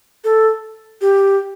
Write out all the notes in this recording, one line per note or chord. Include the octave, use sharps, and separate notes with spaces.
A4
G4